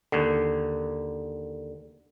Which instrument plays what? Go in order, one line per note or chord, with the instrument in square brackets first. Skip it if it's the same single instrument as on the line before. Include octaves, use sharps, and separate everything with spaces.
[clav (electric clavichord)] D#2 D3